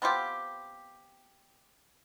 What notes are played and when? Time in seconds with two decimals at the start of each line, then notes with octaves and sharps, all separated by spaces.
0.02 B3 C4 F4 G4